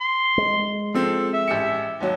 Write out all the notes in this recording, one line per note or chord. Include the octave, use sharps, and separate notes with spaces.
C6
G#3
F3 C4 A4
E5
A1 G4 C#7
D#2 F#3